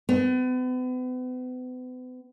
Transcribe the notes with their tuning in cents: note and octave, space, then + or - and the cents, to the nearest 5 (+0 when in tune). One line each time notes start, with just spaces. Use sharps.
B3 +40